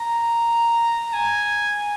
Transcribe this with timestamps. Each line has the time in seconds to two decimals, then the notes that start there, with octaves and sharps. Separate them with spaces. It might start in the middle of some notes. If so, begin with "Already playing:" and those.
Already playing: A#5
1.13 G#5